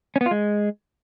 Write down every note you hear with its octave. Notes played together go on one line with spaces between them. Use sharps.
C#4
B3
F4
G#3